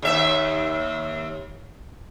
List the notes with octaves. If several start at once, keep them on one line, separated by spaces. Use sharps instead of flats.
D#2 E5